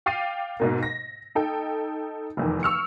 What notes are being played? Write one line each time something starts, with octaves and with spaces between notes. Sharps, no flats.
F5 G5 D6 A6 C7 D#7
G#2 B2 A#3
A#6
D#4 A4 G5
F1 E2 D#3
C#6 E6 F6 C#7